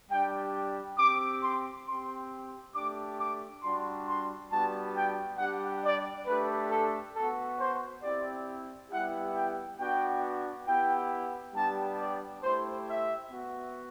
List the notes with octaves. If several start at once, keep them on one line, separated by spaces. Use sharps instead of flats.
G3 D4 G4 G5
C4 G4 D6
C6
C4 G4 C6
A3 D4 G4 D6
D6
G3 D4 F#4 C6
C6
G3 B3 D4 F#4 A5
G5
G3 D4 G4 F#5
D5
A3 D4 G4 B4
A4
B3 F#4 A4
C5
C4 E4 G4 D5
G3 B3 E4 G4 F#5
G5
B3 D4 F#4 G5
B3 E4 G4 G5
G3 B3 D4 G4 A5
D5
A3 E4 G4 C5
E5
B3 F#4